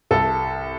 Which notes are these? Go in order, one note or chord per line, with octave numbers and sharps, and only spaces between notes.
C2 A4